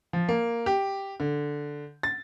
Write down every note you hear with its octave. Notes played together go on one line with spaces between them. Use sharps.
F3
A#3
G4
D3
A6